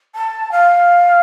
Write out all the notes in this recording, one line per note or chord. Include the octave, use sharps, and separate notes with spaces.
A5
F5